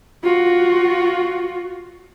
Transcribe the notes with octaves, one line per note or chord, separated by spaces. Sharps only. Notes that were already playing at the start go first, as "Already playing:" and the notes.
F4 F#4